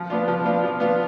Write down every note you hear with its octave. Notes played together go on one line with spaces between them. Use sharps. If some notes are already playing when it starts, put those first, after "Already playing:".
Already playing: F3
B3 D4 F4
F3
B3 D4 F4
F3
B3 D4 F4